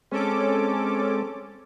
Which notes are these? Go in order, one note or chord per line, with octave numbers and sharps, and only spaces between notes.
G#3 C4 C#4 A4 D6